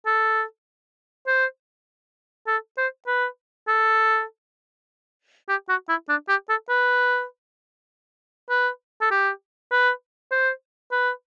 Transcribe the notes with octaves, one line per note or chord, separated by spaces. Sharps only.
A4
C5
A4
C5
B4
A4
G4
F#4
E4
D4
G4
A4
B4
B4
A4
G4
B4
C5
B4